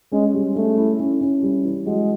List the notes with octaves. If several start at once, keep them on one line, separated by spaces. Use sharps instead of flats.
G#3 C#4
G3
A3 C#4
E4
C#4
C#4
G3
E3
F#3 G#3